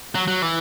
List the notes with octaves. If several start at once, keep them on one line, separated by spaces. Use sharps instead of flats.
F#3
F#3
E3